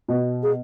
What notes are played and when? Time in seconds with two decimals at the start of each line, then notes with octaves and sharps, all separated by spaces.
0.08 B2
0.43 G#4